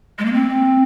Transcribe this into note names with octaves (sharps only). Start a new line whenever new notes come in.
G#3
A#3
C4